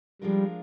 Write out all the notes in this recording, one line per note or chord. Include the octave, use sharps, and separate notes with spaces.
F3 G3 G#3 D4 F4 A#4